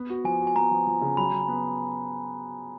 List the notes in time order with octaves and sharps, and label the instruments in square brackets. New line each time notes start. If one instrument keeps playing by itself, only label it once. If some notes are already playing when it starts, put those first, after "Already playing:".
Already playing: [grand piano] B3
F#4
[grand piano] F3 [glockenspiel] G#5
[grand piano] F#4
[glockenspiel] G#5
[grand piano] B3 [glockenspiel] A#5
[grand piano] F3
F3
C#3
[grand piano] F#3 [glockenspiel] B5
[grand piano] F#3
B3